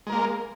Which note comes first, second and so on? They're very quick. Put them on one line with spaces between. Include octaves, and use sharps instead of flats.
G#3 A#4 A#3